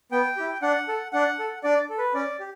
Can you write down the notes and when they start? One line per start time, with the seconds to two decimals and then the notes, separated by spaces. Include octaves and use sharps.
0.12 B3 G5
0.37 E4 G4
0.62 D4 F#5
0.88 A4
1.13 D4 F#5
1.39 A4
1.63 D4 D5
1.89 A4
1.98 B4
2.14 C#4 D5
2.40 G4